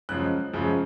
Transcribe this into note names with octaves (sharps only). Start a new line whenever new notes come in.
F#2 C#3 F3 G#3 F#6
F#2 C#3 F3 G#3